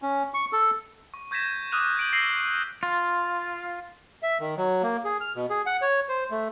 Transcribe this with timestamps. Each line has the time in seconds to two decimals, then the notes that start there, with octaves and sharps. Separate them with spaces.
0.02 C#4
0.34 C#6
0.53 A4
1.14 C#6
1.31 C#6 G6 G#6 A#6 B6 E7
1.72 D6 D#6 F6 F#6 D#7 F7
1.97 G6 D7 F#7
2.13 E6 A#6 C7 D7 F#7 G7
2.83 F4
4.23 E5
4.40 D#3
4.57 F#3
4.83 A#3
5.05 G#4
5.21 F6
5.35 B2
5.50 G#4
5.66 F#5
5.82 C#5
6.09 C5
6.30 A3